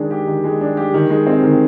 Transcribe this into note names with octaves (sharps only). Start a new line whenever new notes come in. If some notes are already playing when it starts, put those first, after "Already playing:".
Already playing: D#3 G#3 D4
G4
D#3
G#3
D4
G4
D#3
G#3
C4
D#3